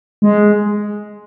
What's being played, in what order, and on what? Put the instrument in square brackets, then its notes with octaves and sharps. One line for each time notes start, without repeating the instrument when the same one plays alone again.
[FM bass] G#3